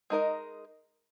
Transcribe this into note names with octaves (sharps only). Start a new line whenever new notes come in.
G#3 D#4 A#4 D#5